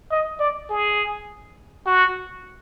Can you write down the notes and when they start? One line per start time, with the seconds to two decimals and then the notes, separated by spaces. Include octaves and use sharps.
0.11 D#5
0.39 D5
0.69 G#4
1.86 F#4